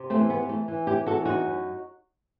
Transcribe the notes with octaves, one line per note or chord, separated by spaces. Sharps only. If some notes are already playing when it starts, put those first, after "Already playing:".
Already playing: C3
A3 C4
E3
B3
E3
A3
E3
E4 G4
E3
F#4 A4
E2
D#4 F#4
F#2